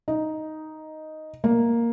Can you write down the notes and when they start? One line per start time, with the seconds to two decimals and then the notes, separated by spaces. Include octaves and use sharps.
0.08 D#4
1.44 A#3